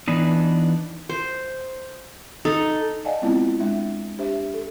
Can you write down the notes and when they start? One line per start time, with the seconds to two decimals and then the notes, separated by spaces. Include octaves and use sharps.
0.08 E3 B3 D4 D#4
1.09 C5
2.45 D#4 A4
3.05 D5 D#5 F5 F#5 G#5 A5
3.22 G#3 B3 C4 E4 F4
3.60 G#3 D4 E5
4.18 D4 G4 C5 E5
4.54 A4